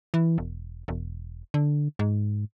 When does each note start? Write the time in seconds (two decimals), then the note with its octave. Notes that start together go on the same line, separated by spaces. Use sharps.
0.14 E3
0.38 E1
0.88 E1
1.54 D3
1.99 G#2